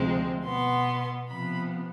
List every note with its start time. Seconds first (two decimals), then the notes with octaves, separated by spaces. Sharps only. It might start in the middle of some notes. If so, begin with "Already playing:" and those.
Already playing: D2 C3 F3 G#3 C4
0.44 B2 B3 C6
1.28 C3 F3 B3 B5